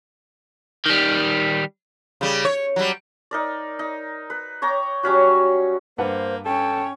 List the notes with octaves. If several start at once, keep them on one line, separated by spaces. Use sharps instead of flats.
D#3 G3
C#3 G3
C#5
F#3 G3
D#4 A#4 D5
D#4
B4
C#5 G5 A#5 D6
F#3 G3 C#4 F#4
G2 A#3 B4 C5 F#5
C#4 A4 C#5 G5